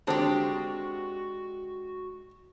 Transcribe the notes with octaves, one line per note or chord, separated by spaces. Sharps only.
D3 G#3 C4 D4 F#4 G4 A5